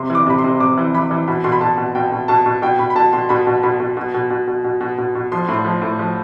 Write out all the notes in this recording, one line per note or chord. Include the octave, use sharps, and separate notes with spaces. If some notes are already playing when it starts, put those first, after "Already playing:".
Already playing: C3 C6
E3
D6
C3 B5
C6
C3
C3 D6
E3
E3 B5
E3
B2 B5
B2 C6
B5
B2 A5
B2
B2 G5
B2
B2 A5
B2
B2 G5
B2 B5
B5
B2 A5
B2 C6
B2 B5
B2
B2 B5
B2
B2
B2
B2
B2
B2
B2
B2
B2
F3 C6
A2
C6
F3
A2
F3